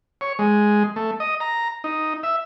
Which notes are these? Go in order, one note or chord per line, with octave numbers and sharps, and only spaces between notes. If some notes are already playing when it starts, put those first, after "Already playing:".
C#5
G#3
A3
D#5
A#5
D#4
E5